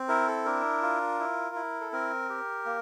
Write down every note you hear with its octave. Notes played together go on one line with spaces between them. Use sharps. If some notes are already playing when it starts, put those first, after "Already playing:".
Already playing: C4
E4 A#4
A4
D4 A#4
F4
E4
E4
A4
C4 A#4
G4
A#3